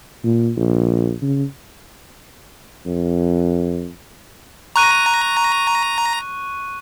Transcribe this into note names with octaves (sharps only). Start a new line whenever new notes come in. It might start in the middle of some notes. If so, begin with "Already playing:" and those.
A#2
A#1
C#3
F2
A#5 C#6 F#6 D#7